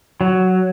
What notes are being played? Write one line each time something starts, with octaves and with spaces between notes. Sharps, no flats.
F#3